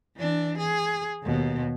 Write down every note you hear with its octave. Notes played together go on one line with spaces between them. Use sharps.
E3 D4
G#4
D#2 B2